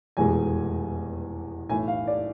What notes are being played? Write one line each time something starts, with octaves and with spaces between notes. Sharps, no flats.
F1 E2 B2 G#3 G#5
B1 A2 E3 G#5
F5
D5